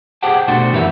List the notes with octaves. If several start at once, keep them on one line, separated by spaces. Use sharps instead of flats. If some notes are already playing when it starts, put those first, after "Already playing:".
G4 G#4 C5 F#5 G5 A5
B2 A3 D4 F#4 C5
F#2 E3 G4 A#4 B4 E5